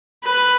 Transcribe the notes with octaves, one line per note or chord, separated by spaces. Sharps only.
B4